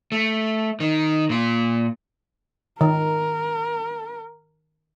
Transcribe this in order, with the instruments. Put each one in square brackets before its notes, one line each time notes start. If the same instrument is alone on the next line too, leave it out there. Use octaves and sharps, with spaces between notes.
[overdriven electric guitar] A3
D#3
A#2 F4
[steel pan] D#3 [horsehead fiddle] A#4